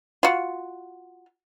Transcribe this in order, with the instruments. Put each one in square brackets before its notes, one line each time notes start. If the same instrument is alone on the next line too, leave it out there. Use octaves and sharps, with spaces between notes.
[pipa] F4 F#4